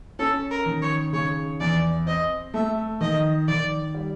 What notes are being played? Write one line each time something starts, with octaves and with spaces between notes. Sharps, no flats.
C#4 A4
A#4
D#3
C#5
C#3 C#5
E2 D5
C4 D#5
A3 E5
D#3 D#5
D#3 D5
G3